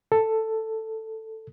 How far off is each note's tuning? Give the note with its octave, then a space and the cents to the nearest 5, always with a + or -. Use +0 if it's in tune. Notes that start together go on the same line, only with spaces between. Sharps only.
A4 +5